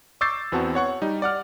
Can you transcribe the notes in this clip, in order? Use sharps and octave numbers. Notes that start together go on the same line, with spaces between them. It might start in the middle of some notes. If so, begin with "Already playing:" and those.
C#6 D6 E6 G6 A6 C7
E2 B3 C4 F#4 A5
C#5 F#5 C#6
G3 D#4
D5 F#5 F6